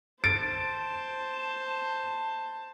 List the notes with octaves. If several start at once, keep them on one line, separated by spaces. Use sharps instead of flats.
C5 A5 A6 D7